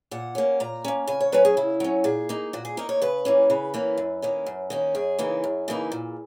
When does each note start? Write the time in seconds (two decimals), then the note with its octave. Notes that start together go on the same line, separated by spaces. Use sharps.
0.11 A#2 F#5
0.35 A#3 C#4
0.60 A#2 A#5
0.85 A#3 C#4
1.07 C#3 G#5
1.20 C#5
1.32 F#3 C#4 B4
1.45 G#4
1.57 C#3 E4
1.80 F#3 C#4
2.04 A#2 G#4
2.29 A#3 D#4
2.53 A#2 F#4
2.65 G#4
2.77 A#3 D#4 A#4
2.89 C#5
3.02 C#3 B4
3.25 E3 A#3 C#4
3.50 C#3 B4
3.74 E3 A#3 C#4
3.97 F#2
4.22 D#3 A#3 C#4
4.46 F#2
4.70 D#3 A#3 C#4
4.95 F#2 G#4
5.19 C#3 E3 A#3 D#4
5.44 F#2
5.68 C#3 E3 A#3 D#4
5.92 A#2